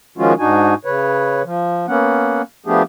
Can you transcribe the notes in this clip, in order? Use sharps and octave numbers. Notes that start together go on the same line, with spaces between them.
D#3 F3 G#3 C#4 F4 F#4
G#2 D4 D#4 F#4 G#5
C#3 B4 C#5
F3
A#3 B3 C#4 F#5
F3 A3 B3 D4 G4 G#4